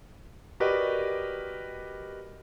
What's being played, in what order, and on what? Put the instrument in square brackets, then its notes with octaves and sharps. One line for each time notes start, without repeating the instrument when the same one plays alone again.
[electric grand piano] F#4 G4 A#4 B4 D5 D#5